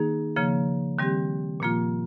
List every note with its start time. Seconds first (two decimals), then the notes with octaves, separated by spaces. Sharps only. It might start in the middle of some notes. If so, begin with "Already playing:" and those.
Already playing: D#3 A#3 D#4 G#4
0.36 C#3 F3 A#3
0.99 D#3 G3 C4 G4
1.60 A#2 F3 A#3 F4